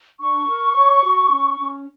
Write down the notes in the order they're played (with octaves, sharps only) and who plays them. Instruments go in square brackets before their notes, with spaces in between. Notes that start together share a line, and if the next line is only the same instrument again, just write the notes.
[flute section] D4 C#6
A#4
C#5
F#4
C#4
C#4